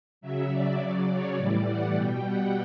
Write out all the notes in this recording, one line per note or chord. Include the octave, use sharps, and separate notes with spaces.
C#3 F#3 E5
D5
C#3 F#3
C#5
A2 E3 G3 D5
F#5
B2 G3 G5
F#5